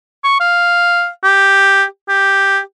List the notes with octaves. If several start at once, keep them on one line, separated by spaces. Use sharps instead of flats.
C#6
F5
G4
G4